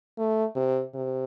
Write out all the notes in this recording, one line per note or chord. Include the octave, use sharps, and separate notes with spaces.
A3
C3
C3